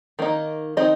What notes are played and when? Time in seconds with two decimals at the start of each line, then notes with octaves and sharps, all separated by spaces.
0.19 D#3 A#3 D#4
0.77 D#3 C4 D#4 D#5